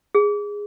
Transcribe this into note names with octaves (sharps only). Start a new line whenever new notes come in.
G#4